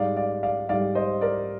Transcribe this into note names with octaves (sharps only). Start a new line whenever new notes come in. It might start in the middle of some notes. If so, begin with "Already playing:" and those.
Already playing: G#2 G3 D5 F5
D5 F5
D5 F5
G#2 G3 D5 F5
C5 D#5
A#4 D5